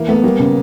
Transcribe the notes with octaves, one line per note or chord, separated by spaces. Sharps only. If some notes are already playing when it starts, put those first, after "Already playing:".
Already playing: E3 A#3 E4
A3 B3
G3 A#3
C#3